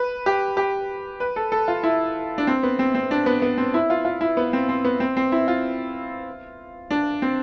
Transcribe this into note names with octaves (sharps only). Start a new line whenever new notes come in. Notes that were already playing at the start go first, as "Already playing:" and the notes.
Already playing: B4
G4
G4
B4
A4
A4
F4
E4
D4
C4
B3
C4
C4
D4
B3
B3
C4
E4
F4
F4
E4
B3
C4
C4
B3
C4
C4
E4
F4
D4
C4